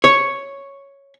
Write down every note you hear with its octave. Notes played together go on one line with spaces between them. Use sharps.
C#5